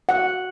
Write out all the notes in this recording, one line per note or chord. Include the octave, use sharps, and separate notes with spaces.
F#5